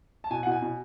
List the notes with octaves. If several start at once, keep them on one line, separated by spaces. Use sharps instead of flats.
A5
B2 G#5
B2 F#5
G#5
B2